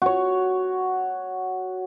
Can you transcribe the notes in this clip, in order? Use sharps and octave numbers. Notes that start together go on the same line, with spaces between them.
F#4 C#5